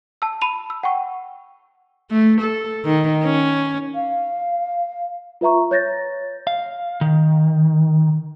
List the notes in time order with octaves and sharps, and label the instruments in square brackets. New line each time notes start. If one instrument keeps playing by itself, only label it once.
[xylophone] A5 E6
B5 D#7 F7
E6
F#5 G5 C#6
[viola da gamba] A3
A4
D#3
C#4
[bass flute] F5
[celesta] F4 B4 E5 A#5 C#6
C#5 G6 A6 A#6
[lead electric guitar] F5
D#3